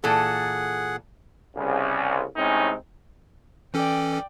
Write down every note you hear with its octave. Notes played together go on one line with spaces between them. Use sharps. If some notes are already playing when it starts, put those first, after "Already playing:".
A#2 E3 G#4 A4 F#5
C2 C#3
A2 C3 G#3 C4 C#4 D#4
E3 C#4 A4 D5 G5